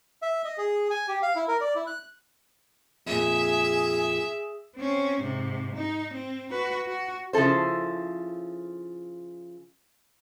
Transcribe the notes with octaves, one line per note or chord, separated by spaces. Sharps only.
E5
D#5
G#4
G#5
G4
F5
E4
A#4
D5
E4
F#6
F2 A#2 G#4 E5
C4 C#4
G#2 C3
D#4
C4
F#4 B4
F#4
C#3 F3 E4 A4 C5